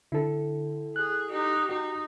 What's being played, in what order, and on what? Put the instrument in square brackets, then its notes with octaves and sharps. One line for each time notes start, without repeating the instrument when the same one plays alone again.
[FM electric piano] D3 [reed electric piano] E4 A4
[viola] G#4 [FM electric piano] F#6
[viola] D#4 G4
[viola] D#4 [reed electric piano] F#4 G4